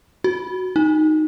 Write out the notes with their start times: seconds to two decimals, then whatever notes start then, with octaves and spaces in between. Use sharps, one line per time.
0.24 F#4
0.76 D#4